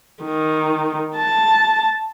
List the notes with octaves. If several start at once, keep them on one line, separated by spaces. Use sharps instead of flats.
D#3
A5